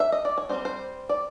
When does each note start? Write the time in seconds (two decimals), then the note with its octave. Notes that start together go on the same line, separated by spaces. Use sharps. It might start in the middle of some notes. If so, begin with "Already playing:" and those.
0.00 E5
0.12 D#5
0.25 D5
0.38 C#5
0.49 G3 C4 D#4 C5
0.65 C5
1.09 D5